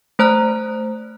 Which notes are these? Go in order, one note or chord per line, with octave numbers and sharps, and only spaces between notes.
A3 C5 A#5 F#6